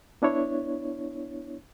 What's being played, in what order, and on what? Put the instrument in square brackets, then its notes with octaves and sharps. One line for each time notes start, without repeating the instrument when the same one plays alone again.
[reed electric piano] B3 D4 E4 C#5